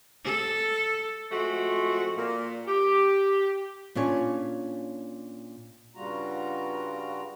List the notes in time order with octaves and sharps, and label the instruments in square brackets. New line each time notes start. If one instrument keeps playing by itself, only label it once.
[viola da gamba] A4
[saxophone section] F3 G#3 A3 C4 F#4
A#2
G4
[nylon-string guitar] A#2 C#4 D4 C#5
[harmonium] G2 C#3 G3 F4 F#4 A#5